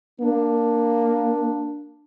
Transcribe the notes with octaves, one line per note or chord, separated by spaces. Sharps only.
A#3 D4